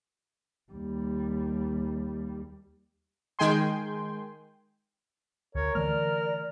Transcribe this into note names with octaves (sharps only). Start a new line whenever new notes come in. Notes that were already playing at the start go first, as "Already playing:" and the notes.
D#2 G3
D#3 G#3 G5 G#5 C6
D2 A#4 C#5
D3 E3 A3 D5 F6